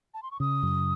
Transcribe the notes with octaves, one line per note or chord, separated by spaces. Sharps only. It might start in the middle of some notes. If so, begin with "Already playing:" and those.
A5
C6
C#6
C#3 D#6
F#2